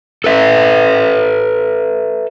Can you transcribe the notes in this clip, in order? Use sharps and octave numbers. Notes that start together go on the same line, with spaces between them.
A4 B4 E5